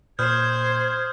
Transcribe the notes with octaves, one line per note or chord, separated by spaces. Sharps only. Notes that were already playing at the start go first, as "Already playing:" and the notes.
A#2 C5 D#6 F6 G6 G#6